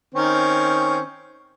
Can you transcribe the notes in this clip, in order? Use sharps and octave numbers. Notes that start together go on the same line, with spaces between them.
D#3 C4 C#4